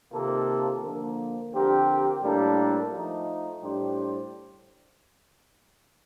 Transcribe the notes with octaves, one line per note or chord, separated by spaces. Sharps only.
C3 D#3 A#3 F4 A4
D3 F3 A#3
D3 F3 C4 G4 A#4
A2 G3 A#3 D4 A4
F3 A3 D#4
A2 G3 D4 G4 C5